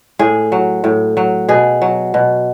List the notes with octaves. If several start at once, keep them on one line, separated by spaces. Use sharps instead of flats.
A2 G#4
F#3
A2
F#3
B2 G#4
F#3
B2